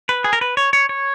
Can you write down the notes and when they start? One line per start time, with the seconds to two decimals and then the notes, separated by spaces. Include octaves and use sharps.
0.09 B4
0.24 G#4
0.33 A#4
0.41 B4
0.57 C#5
0.73 C#5
0.89 C#5